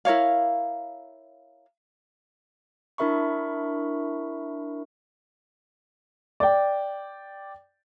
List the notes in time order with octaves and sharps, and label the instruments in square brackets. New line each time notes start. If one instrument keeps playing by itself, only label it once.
[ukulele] E4 A#4 C#5 F5
[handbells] D4 E4 A#4 E5 B5 C#6
[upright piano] D5 G5